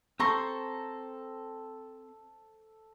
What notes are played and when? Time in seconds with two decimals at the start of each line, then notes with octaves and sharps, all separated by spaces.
0.20 C4 A4 C5 A#5 C6 C#6